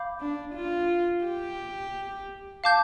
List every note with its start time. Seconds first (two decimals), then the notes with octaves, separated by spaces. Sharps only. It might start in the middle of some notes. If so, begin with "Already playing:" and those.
Already playing: F5 B5 D6 G6
0.20 D4
0.55 F4
1.25 G4
2.64 F5 A5 D6 G6